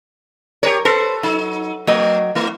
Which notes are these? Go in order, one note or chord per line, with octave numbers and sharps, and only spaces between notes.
G4 A#4 B4 C#5
A4 B4 C5
F#3 D#4
F#3 A3 D#5 G5
A3 E4